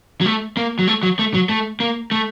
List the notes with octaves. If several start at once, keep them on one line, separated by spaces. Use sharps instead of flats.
F#3
A3
A#3
F#3
A3
F#3
A3
F#3
A3
A#3
A3